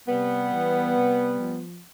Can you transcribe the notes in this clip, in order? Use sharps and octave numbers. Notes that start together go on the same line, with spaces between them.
C3 G3 B3
E3
C3
F3